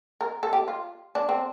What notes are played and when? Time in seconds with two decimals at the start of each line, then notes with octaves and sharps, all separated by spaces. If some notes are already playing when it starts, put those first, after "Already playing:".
0.21 A#4
0.43 A4
0.53 G4
0.68 F4
1.15 D4
1.29 C4